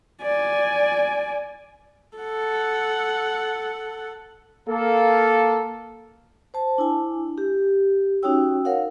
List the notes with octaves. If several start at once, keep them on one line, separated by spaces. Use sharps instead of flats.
D5 G#5
A4 F#5
A#3 A4
C5 A5
D4 E4 G#5
G4
C#4 D#4 F#4 C#5 G5 E6
A#4 C#5 F5 F#5